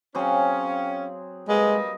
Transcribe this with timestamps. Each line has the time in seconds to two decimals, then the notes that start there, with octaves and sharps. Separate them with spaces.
0.15 F#3 C4 C#4 G#4 C5 F5 G5
1.49 G3 G#3 A#3 B4 D#5